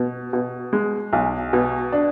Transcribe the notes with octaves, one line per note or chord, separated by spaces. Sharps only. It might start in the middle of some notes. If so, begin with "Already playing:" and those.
Already playing: B2
B2
G#3
B1
B2
D4